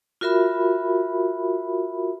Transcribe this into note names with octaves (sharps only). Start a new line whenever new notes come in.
F4 F#4 A#4 E5 B5